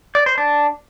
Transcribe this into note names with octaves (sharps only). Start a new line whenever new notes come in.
D5
C5
D4